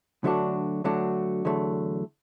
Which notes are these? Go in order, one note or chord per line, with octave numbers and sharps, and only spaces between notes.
D3 F#3 A3 D4 F#4
D3 F#3 A3 D4 F#4
E2 D3 F#3 A3